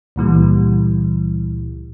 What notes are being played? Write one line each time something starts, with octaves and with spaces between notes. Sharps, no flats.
C#2 A#2 E3 G3